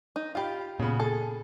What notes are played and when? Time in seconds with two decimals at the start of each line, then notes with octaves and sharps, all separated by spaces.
0.16 D#4
0.35 F4 G4 F5 B5
0.79 A#2 C#3 B3
1.00 G#4 A4